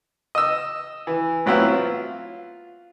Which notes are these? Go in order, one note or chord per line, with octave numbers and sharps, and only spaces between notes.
D#5 E6
E3
A2 F#3 B3 C4 E4 F4
F4